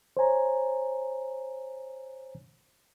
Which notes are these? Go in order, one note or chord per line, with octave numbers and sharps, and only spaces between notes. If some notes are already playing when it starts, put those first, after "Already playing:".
C5 C#5 G#5 A#5